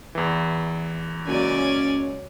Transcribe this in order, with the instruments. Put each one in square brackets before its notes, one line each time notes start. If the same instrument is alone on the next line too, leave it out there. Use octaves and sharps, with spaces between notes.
[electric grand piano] E2 E3
[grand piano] C#2 F#3 A#3 [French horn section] C#4 [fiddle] D5 G#5